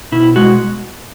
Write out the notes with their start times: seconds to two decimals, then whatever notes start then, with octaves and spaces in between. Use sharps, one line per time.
0.12 B2 E4
0.36 G#3 F#4